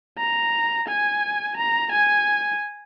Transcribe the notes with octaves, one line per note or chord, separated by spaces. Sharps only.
A#5
G#5
A#5
G#5